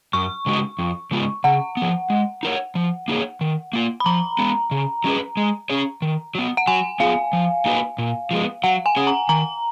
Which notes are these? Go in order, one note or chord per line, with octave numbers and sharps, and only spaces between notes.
F#2 C#6
C#3 G#3 D#4 F#4
F2
C#3 G#3 B3 F4
C#3 F#5
F3 B3
G#3
D#4 A#4 C#5
F3
A#3 D#4 G#4 C#5
D#3
A#3 F4
B5
F3 A#5
G#3 B3
C#3
F#3 C#4 G#4 B4
G#3
C#4 G#4 C#5
D#3
F#3 B3
F#5
F#3 G#5
B3 F4 G#4 F5
F3
A#3 D#4 F#4 B4
A#2
F3 G#3 B3
F#3 F#5
G#5
C#4 G#4 C#5
A#5
D#3 A#5